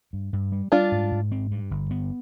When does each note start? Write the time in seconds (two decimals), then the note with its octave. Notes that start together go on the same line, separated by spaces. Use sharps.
0.13 G2
0.33 G2
0.52 G3
0.72 G3 D4 F4
0.92 G#2
1.11 G#2
1.32 C4
1.51 G2
1.71 G1
1.91 B3